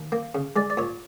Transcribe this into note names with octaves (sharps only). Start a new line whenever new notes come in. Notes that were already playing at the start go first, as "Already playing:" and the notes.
Already playing: D#2
A#3
C#3
G#3 D5
D5
A#2 C#5